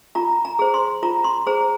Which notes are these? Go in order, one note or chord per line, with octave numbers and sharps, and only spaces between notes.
F4 A#5
A#5
G#4 C5
C6
F4 A#5
C6
G#4 C5 A#5